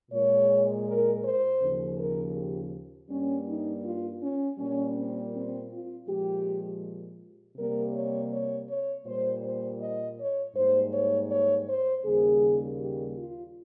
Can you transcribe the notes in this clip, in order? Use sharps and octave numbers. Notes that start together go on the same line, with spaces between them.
A#2 G#3 C#5
A#4
C5
D#2 C#3 F3
A#4
G4
G2 G3 A#3 C#4
D#4
F4
C#4
A#2 G3 A#3 C#4
C4
C4
F4
A#2 F3 G#3 G4
C3 G3 A#3 A#4
C#5
C#5
C#5
A#2 G3 A#3 C5
C5
D#5
C#5
G#2 G3 A#3 C5
C#5
C#5
C5
D#2 C#3 G3 A#3 G#4
G4
F4